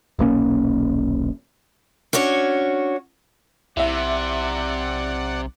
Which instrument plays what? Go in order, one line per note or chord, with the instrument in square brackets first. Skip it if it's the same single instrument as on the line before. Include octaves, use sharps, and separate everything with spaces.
[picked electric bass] D#1 B1 A#3 C#4
[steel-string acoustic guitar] C#4 D4 F#4 C#5
[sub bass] B1 [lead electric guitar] C3 [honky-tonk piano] E4 E5 [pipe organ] D5 F#5